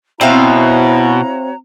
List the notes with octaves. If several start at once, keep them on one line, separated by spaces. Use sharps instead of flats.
B2 C4 E4 F#4 C#5 E5 F5 A#5